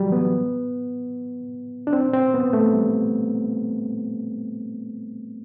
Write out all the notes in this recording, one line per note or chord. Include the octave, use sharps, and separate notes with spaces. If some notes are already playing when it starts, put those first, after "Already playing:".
Already playing: E3 F#3 G3
B3
D4
C4
C4
B3
A3
G3